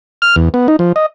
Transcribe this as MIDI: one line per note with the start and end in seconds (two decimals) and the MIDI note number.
0.22 0.36 89
0.36 0.49 40
0.54 0.67 59
0.68 0.76 63
0.79 0.92 53
0.96 1.06 75